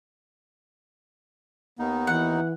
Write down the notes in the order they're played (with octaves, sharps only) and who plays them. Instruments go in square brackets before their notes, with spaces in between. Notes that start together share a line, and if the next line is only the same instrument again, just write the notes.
[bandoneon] D#2 D#3 D#4 [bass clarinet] B3
[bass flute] E3 [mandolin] F#5